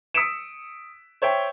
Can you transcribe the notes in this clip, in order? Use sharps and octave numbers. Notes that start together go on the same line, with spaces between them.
D#6 E6 B6 C#7 D7 E7
C5 C#5 E5 G5